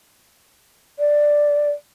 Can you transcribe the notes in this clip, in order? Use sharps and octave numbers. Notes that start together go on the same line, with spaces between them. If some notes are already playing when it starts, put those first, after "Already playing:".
D5